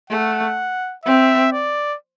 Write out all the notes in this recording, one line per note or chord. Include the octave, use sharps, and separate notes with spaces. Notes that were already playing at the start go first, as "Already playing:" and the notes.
A3 F#5
C4 E5
D5